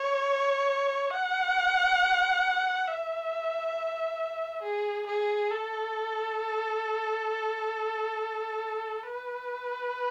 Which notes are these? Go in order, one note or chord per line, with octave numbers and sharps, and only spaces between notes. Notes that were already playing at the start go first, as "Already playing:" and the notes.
Already playing: C#5
F#5
E5
G#4
G#4
A4
B4